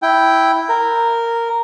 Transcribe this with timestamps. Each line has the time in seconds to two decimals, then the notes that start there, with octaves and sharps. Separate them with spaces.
0.02 E4 G5
0.69 A#4